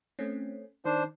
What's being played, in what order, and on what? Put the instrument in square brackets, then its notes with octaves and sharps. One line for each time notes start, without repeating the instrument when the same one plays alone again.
[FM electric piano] A3 C4 C#4
[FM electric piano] D#3 [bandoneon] D4 C5